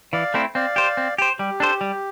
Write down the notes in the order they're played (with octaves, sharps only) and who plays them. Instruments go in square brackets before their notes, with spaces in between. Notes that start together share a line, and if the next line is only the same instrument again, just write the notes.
[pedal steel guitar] E3 [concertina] D5 F5
[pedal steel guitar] A3 C4 E4
[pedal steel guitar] C4 [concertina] D5 F5
[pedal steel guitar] G4 C5
C4
G4 C5
[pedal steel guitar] G3 [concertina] G4
[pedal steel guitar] D4 A4 C5
G3